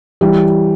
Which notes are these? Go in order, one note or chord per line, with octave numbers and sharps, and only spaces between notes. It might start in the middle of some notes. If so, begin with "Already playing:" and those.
E3 G3